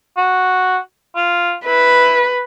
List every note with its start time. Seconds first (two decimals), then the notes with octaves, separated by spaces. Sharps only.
0.17 F#4
1.16 F4
1.66 E4 B4